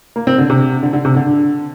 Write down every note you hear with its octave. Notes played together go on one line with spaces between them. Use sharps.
A#3
C4
D3
C3
D3
D3
C3
D3